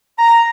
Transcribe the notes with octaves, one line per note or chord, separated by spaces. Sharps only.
A#5